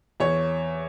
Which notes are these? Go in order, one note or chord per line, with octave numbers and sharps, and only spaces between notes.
E2 C#5